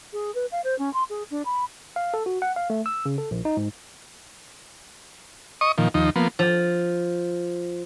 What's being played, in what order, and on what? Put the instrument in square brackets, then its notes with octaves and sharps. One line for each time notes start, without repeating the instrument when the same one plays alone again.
[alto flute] G#4
B4
F5
C5
C#4
C6
G#4
D4
B5
[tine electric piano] F5
A4
F#4
F#5
F5
A3
E6
C#3
A4
A#1
D#4
G#2
[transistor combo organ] D#5 C#6 D#6
A#2 D#3 F3
D#2 F3 D#4
F3 A#3 B3
[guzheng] F3